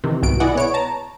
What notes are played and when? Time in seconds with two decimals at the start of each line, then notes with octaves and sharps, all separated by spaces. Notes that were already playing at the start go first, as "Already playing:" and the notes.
0.04 C3 D#3 E3
0.23 C2 G#2 B2 D7
0.40 E4 G#4 D5 D#5 F#5
0.55 B3 C#5 D7
0.74 A5 A#5